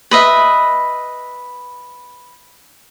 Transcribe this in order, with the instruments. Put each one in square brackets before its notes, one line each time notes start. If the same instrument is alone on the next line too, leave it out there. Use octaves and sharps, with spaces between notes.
[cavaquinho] B4 D#5 E5